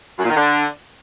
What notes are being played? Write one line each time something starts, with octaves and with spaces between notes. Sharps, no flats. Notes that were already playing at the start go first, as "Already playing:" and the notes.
F#2
A#2
D#3
D3